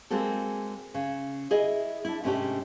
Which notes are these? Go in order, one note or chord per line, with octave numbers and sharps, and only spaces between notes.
G#3 A#3 C4 F#4 A4
C#3
E4 G#4 D#5 E5
D4 E4
G#2 C3 A3 C#4 D4 G4